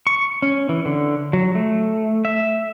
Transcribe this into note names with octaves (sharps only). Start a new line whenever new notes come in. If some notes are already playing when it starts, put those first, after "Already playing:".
C#6
C#4
E3
D3
F#3
A3
E5